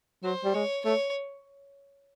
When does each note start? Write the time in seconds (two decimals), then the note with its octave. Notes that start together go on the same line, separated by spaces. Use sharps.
0.24 F#3 C5
0.44 G3
0.54 G#3 C#5
0.85 A3 C#5